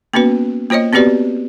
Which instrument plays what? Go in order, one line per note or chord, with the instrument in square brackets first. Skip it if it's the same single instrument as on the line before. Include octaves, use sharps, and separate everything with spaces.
[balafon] A#3 B3 C#4 F#4 B4
A#3 F4 C5 C#5 D#5
B3 C4 F#4 G4 B4 D5